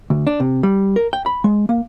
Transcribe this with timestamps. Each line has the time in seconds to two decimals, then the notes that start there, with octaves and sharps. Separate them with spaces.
0.10 D2
0.27 D4
0.40 C3
0.63 G3
0.96 A#4
1.13 G5
1.26 B5
1.44 G#3
1.69 A#3